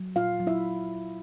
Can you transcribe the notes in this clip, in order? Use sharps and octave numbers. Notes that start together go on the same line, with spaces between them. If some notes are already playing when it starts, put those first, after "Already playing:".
Already playing: F#3
A#2 F4 F5
F#3
E4 E5